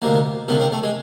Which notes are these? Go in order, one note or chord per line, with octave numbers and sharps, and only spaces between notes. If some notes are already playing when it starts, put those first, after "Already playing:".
D2 C3 D#3 A#3
C#2 C3 D#3 B3
C4
A3
G#3